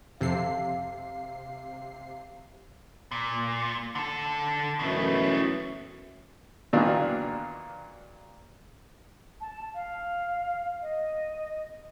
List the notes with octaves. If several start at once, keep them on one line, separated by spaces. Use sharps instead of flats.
F2 C3 A4 F5 C7
A#2
D3 A4
F#2 B2 E3 A3
A#2 D#3 E3 F#3 D4 F4
A5
F5
D#5